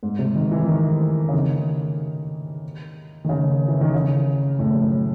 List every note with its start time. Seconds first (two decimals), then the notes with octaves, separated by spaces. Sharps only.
0.03 G#2
0.19 C3
0.35 D#3
0.51 E3
0.68 D#3
1.29 C#3
1.34 D#3
3.24 D#3
3.29 C#3
3.68 E3
3.81 D#3
3.94 C#3
4.59 A2
4.75 F#2